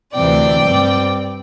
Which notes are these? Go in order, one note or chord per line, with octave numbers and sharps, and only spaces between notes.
D2 C3 E3 C4 D5 G5
G2 G3 C4